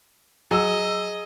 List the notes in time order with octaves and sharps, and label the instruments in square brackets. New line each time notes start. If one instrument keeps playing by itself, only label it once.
[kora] F#3 [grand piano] G#4 E6 [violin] D#5